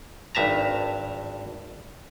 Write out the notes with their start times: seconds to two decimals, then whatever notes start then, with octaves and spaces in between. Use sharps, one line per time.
0.35 G#1 G2 E5 A5 A#5